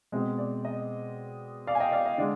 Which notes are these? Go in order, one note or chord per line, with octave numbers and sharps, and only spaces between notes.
B2 G#3 C4 D#5
D5
D#5
D5 F5
G#5
D#5 G5
D5 F5
D#5
D3 G#3 D5